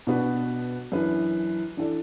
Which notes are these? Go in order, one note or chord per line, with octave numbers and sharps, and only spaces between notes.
B2 B3 D4 F#4 B4
F#2 E3 D4 B4
E3 D4 A4 D5